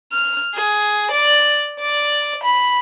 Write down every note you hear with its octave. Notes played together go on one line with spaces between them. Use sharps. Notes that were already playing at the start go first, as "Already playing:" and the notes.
F6
G#4
D5
D5
B5